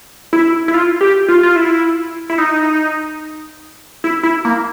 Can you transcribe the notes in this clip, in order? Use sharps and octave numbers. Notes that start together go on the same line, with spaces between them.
E4
E4
F4
G4
F4
F4
E4
E4
D#4
E4
E4
A#3